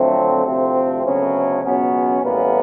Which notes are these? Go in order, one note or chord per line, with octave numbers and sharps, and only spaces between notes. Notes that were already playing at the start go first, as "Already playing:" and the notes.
Already playing: F2 D3 F#3 A3 C4
D2 C3 F3 A3 C4
D2 C#3 F#3 A3 B3 C#4
C#2 B2 F#3 B3 C#4
A1 A2 E3 G3 A#3 B3